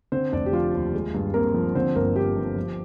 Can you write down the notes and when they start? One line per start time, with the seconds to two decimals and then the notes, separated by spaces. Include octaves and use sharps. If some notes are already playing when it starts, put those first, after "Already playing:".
0.12 D3 C4 C5
0.33 F1 D4 D5
0.46 G4
0.53 F3 F4
0.74 D#2
0.94 G#3
1.14 G2
1.34 A#3 C4 A#4
1.54 F3
1.75 D3 C4 C5
1.95 G1 A#3 A#4
2.15 F3 G4
2.36 G2
2.56 F3